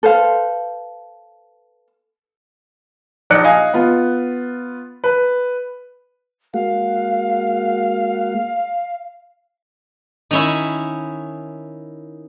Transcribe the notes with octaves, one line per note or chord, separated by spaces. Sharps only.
A4 B4 C5 F5
A#1 D#4 D5 F#6 C#7
D#5 F5 G#5
B3 F4
B4
G#3 A#3 F#4 F5
D#3 C#4 E4